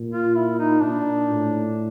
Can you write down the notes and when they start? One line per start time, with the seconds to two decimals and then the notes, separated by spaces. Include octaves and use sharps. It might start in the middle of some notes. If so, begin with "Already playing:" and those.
Already playing: A#2
0.11 F4
0.35 E4
0.59 D#4
0.82 A#2 D4
1.29 A2